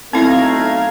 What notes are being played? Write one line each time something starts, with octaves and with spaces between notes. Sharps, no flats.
B1 A3 C4 E4 F5 A#5 G#6